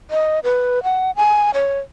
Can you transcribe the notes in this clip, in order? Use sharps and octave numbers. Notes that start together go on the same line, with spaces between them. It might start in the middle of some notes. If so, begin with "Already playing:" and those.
D#5
B4
F#5
G#5
C#5